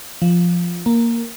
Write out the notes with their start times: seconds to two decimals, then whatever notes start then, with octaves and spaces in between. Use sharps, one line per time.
0.22 F3
0.86 A#3